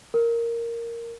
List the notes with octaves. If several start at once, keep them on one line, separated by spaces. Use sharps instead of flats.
A#4